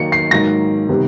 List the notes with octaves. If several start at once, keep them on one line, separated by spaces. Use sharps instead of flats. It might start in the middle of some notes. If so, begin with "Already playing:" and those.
Already playing: D#3 F#3 A#3 D#4 C#7
C7
G#2 D#3 F#3 A#3 A#6
C3 D#3 G3 B3